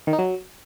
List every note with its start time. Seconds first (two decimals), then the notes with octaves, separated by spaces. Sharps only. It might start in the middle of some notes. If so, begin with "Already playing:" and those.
0.07 D#3
0.13 D#4
0.19 F#3